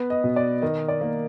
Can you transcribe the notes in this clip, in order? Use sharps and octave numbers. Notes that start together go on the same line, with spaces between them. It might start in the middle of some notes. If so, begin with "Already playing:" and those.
Already playing: B3 B4
D#5
B2
D5
D#3 D#5
D5
A#3